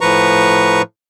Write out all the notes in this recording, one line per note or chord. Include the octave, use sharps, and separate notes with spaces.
A2 F3 B4 A#5 C#6